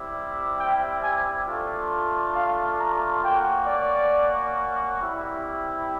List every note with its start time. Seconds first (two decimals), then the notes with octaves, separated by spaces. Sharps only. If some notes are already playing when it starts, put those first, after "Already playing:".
Already playing: G3 C4 E4 G4
0.59 G5
1.03 G#5
1.47 A3 D4 F4
2.35 F5
2.80 A#5
3.23 A#3 C#4 F#4 G5
3.67 D5
4.99 G3 C4 E4 G4